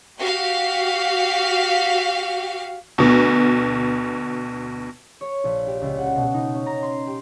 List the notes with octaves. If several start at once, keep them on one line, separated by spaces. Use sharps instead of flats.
F#4 G4 F5
D2 B2
C#5
A#1
G4
C#2
F#5
B2
D#4
C#4
A#5
C6
G4